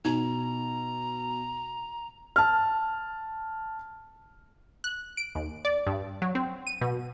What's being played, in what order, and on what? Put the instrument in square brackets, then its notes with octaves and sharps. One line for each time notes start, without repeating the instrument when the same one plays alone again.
[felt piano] B2 [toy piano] D#4 [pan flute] A#5
[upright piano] A5 F6
[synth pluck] F#6
D7
D#2
D5
G2
F#3
C4
D#7
B2